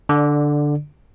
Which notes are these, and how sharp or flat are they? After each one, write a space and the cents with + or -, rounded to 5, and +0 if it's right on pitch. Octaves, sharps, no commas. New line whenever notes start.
D3 +0 D5 +15